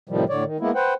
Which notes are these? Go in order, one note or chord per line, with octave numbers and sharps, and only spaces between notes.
A2 C3 D#3 F3 G3
A2 D3 C#5 D5
D#3
G#3 A#3 B3 E4
B4 C5 F#5 G5